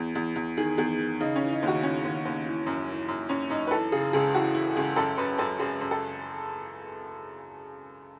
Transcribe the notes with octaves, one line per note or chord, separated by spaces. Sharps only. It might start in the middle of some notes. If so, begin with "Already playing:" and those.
Already playing: E2
E2
E2
D#3 G#4
E2 G#4
D#3
C#3 D#4
C#4
E3
D#4
D#2 F#4
E3 C#4
D#2
D#2
E3
F#2
E3
F#2
F#2 C#4
F#2 D#4
B4
E3 A4
C#3 G#4
C#2 G#4
E3 F#4
E3 E4
C#2 G#4
F#2 A4
F#2 B4
F#2 A4
F#2 G#4
F#2
A4